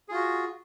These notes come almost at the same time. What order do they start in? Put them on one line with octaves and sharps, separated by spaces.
G#4 F4 F#4